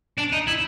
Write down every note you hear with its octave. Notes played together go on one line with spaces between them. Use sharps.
D4
D#4
E4